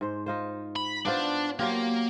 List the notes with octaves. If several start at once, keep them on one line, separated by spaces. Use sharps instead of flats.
G#2 C5
D#4 F4 C5
B5
B3 D4 F4 C5
F#3 A#3 F4 G4